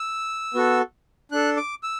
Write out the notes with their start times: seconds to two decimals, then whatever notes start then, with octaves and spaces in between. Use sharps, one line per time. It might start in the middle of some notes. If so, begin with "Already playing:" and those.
Already playing: E6
0.54 B3 F#4 A4
1.32 D4 A4 F#6
1.57 D6
1.83 E6